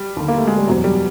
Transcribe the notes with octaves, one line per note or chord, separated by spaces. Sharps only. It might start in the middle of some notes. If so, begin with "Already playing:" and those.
Already playing: G3
D#2 D3
A#3
A3
G#3
G3
F#1 E2 B2 F#3
G3